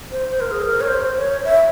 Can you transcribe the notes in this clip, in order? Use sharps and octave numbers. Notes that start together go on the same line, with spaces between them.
C5
C5
A#4
G#4
A#4
C#5
C5
C#5
E5